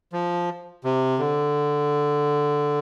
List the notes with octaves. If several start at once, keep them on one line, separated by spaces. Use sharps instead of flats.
F3
C3
D3